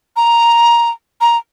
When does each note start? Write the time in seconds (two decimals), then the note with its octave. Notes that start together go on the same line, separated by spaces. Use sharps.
0.16 A#5
1.21 A#5